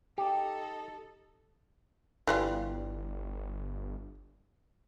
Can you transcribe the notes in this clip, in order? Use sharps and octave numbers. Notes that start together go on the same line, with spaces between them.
D#4 G4 A4
G1 E3 G3 F4